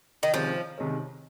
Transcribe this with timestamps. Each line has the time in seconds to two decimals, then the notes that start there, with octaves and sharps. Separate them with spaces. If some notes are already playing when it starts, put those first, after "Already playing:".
0.23 D#3
0.33 C2 C3 D#3 F3 G#3 C#4
0.78 C2 C3 D#3 G#3 C#4